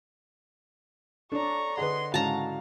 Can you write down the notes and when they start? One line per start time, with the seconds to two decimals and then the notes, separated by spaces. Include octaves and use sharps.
1.32 D4 A4 C#5 D5 A#5 C#6
1.78 D3 G#4 B4 D#5 F#5 C6
2.14 G#2 C#3 E4 F#4 F5 A5 A#5